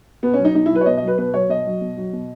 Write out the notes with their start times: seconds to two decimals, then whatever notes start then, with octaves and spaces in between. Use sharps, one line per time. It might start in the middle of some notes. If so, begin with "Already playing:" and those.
0.23 B2 B3
0.34 C#4
0.39 F#3
0.45 D#4
0.55 B2 D#4
0.66 E4
0.71 F#3 B4
0.81 C#5
0.86 B2 D#5
0.97 D#5
1.02 F#3
1.07 B4
1.18 B2 B4
1.34 F#3 C#5
1.49 B2 D#5
1.66 F#3
1.81 B2
1.97 F#3
2.13 B2